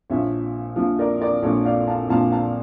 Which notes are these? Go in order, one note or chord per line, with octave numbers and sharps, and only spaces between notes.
A#1 A#2 F3 C#5 E5
A#1 A#2 F3
A#4 D5
A#4 D5
A#1 A#2 F3 A4 C#5
D5 F5
F5 A5
A#1 A#2 F3 F5 A5
F5 A5